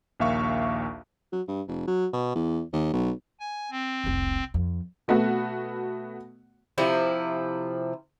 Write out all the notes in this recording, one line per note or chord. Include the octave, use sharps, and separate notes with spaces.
A#1 D#2 A#3 E5 F5 C#6
F#3
G2
F1
F#3
B2
E2
D#2
B1
G#5
C4
F1 C2
F2
B2 A3 B3 F#4
C3 F3 E4